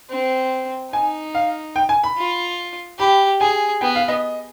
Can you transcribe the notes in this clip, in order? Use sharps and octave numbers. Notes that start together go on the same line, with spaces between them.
C4
D#4 G#5
F5
G5
G#5
B5
F4
G4 B5
G#4 G#5
B3 G5
F5
D#5